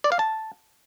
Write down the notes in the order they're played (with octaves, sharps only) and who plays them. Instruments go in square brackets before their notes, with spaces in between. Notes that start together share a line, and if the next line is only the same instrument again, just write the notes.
[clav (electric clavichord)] D5
F5
A5